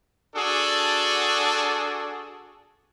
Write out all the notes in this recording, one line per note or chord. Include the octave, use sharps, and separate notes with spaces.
D4 F#4 G#4 A4